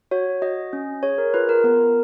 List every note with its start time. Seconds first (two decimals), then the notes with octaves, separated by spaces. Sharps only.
0.11 F#4 C#5
0.42 F#4 D#5
0.73 C#4
1.03 G#4 C#5
1.18 A#4
1.34 F4 B4
1.49 A#4
1.64 B3 A#4